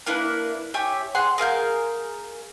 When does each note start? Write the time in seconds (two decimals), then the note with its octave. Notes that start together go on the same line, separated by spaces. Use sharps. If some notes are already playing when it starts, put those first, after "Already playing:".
0.06 A#3 D4 E4 B4
0.74 G4 C#5 E5 G#5
1.15 G#4 F#5 C6
1.38 G#4 A#4 F5 G6